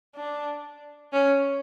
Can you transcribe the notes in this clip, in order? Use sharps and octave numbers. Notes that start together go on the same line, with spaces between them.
D4
C#4